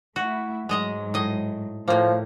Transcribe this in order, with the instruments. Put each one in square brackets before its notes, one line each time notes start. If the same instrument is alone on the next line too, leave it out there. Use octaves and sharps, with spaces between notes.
[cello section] A3 E4 [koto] F#4
[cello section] G#2 F#3 [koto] G#3 D#5 A#5
[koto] A2 D#5
[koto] A2 A#3 [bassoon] F3 [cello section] A3